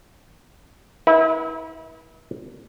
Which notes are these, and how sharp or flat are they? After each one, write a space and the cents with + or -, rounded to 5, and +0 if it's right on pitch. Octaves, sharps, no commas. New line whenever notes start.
E4 -35 B4 -40